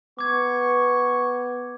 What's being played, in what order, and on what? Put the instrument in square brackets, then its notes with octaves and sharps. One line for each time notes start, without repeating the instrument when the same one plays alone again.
[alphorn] B3 [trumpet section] C#6 [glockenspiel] D6 G#6